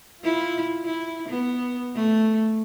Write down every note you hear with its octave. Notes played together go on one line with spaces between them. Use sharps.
E4 F4
E4
B3
A3